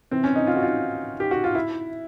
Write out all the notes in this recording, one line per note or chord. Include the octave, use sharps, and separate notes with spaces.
C3 E3 C4
C#4
D#4
F4
F#4
F4
G4
F#4
F4
E4